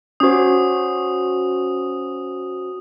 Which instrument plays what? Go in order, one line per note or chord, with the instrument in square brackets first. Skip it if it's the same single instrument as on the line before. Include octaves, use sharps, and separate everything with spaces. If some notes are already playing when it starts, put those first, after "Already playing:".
[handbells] C#4 F#4 C5 [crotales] D#6